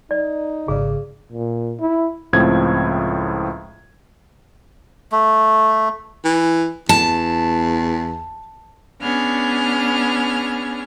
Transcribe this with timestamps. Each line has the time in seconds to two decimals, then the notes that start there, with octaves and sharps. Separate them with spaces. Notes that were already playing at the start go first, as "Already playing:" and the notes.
0.11 D#4 D5
0.68 G#1 G#2 C#3 G#4 D5
1.32 A#2
1.80 E4
2.33 C#2 A2 F3 C4 G#6
5.12 A3
6.25 E3
6.89 E2 A5
9.01 B3 C#4 D4 G#4 F6